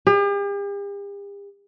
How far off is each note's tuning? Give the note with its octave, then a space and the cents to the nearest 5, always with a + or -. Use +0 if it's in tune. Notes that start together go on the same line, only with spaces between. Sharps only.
G4 +45